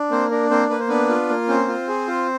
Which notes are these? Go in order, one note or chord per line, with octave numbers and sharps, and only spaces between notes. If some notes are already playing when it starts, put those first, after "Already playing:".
Already playing: D4
A#3 C4 C5
D4 A#4
A#3 C4 C5
A#3 B4
C5
B3 D4 B4
F4
A#3
C4 C#4 C5
F4
G#4
F4